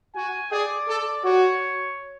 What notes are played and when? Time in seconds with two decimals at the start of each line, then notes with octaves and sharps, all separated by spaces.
0.15 F#4 G#5
0.52 G#4 D5
0.88 A4
1.24 F#4 C#5